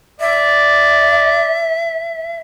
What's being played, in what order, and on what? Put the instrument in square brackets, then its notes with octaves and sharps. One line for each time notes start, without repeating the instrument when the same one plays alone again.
[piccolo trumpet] D5 [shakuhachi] E5